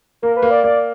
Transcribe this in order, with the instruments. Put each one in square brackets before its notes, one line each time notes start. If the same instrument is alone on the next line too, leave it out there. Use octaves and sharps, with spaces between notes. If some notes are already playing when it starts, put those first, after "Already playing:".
[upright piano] A#3 [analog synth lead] A#4
[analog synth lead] B4
[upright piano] A#3
[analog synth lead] D5
[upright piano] A#3 [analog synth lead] D5